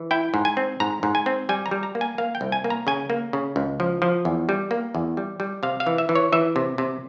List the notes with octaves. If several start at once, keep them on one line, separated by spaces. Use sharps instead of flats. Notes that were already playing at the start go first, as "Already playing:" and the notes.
Already playing: E3
E4 G5
G#2
G#5
C4
G#2 A#5
G#2
G#5
C4
G3 G#5
A#5
G3
A#5
A#3
G#5
A#3 F5
G5
C2
G#5
A#3
A#5
C#3 G#5
A#3
C#3
C#2
F3
F3
E2
G3
A#3
E2
G3
G3
C3 F5
F5
E3
E5
E3
C#5
E3 E5
C3
C3